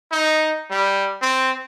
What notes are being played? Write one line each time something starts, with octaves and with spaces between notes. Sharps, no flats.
D#4
G3
C4